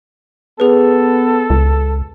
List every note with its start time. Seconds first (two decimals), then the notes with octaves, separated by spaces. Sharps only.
0.60 B3 G#4 A4 B4
1.50 C#2